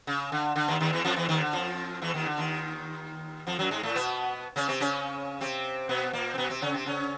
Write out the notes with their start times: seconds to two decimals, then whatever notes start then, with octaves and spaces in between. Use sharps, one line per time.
0.07 C#3
0.32 D3
0.56 D3
0.68 D#2 D#3
0.81 D#2 D#3
0.93 E2 E3
1.05 F2 F3
1.16 E2 E3
1.29 D#2 D#3
1.41 D3
1.53 F2 F3
2.02 E2 E3
2.14 D#2 D#3
2.26 D3
2.38 D#2 D#3
3.47 F2 F3
3.59 F#2 F#3
3.71 G#2 G#3
3.83 A2 A3
3.96 B2 B3
4.56 C#3 C#4
4.68 C3 C4
4.80 C#3 C#4
5.41 C3 C4
5.89 B2 B3
6.13 A#2 A#3
6.34 C4
6.38 B2 B3
6.49 C3 C4
6.62 C#3 C#4
6.74 C3 C4
6.86 C#3 C#4